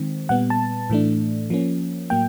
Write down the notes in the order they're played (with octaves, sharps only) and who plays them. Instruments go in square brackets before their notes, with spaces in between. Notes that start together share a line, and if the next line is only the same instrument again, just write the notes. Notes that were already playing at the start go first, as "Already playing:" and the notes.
Already playing: [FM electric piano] D#3 G#3 C4
A#2 G3 B3 F#5
A5
A2 E3 A3 D4
F3 A#3 C#4
A2 F#3 A#3 G5